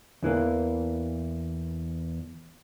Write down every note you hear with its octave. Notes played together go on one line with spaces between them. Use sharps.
E2 E3 A#3